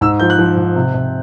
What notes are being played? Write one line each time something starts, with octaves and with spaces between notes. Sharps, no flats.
G#2 E6
F3 G6
F#6
F3
G#2
C3
C3